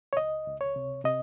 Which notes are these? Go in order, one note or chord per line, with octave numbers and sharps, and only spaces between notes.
C#5
C#2 D#5
C#2
C#5
C3
C3 D#5